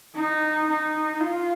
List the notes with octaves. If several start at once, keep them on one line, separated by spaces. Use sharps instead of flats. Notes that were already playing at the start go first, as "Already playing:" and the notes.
D#4
D#4
F4